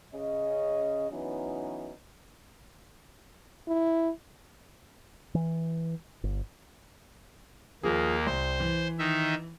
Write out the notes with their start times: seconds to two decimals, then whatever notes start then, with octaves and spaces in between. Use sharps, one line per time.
0.14 C#3 C#4 D#5
1.11 E3 F#3 B3 C#4 D#4
3.68 E4
5.35 E3
6.24 G1
7.83 D#2 F3 A#3 G#4
8.26 C2 C5
8.60 E3
8.99 D#3 D#4 E5